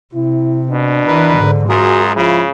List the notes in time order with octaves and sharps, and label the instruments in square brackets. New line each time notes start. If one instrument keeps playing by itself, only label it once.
[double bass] C3 [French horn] E4
[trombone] B2 [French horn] D4
[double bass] E3 [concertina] A#4 B4
[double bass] G#2 D3
[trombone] F#2 [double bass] G#3 [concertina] F4 G#4 A#4 [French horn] F#4
[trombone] C#3 [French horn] F3 [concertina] E4